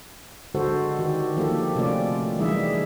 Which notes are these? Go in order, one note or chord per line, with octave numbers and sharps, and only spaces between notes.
D3 G#3 F#4 A4 C5
D#3 F#4 G4
F3 A#3 G4 A4
C3 A3 C#4 F4 D5
E3 G3 G#3 D#4 G#4 E5